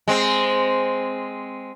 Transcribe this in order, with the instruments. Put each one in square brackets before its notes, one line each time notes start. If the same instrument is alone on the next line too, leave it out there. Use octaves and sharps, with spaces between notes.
[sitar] G#3 C4